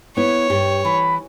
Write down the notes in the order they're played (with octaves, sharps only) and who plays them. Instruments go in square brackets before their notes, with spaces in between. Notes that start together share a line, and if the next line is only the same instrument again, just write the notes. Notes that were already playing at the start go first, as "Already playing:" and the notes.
[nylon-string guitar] B3 E4 [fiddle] C#5
[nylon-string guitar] G2 G4
[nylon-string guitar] E3 [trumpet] B5